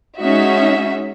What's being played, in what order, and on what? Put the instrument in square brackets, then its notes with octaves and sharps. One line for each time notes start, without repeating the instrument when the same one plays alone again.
[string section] G#3 C#4 D#4 F#4 E5